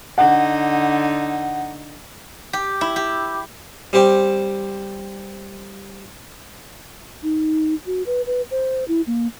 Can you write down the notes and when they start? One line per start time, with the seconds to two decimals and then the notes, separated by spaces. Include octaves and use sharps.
0.18 D3 D#4 F#5
2.53 G4
2.81 E4
2.96 G4
3.93 G3 C4 G4 C5
7.23 D#4
7.86 F#4
8.06 B4
8.27 B4
8.51 C5
8.88 E4
9.07 A#3